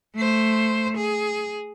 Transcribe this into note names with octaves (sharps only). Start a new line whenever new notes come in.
A3 C5
G#4